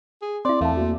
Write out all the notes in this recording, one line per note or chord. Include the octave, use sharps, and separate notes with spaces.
G#4
C4 E4 D5 C6
E2 A3 F5 A5
A#3 F#4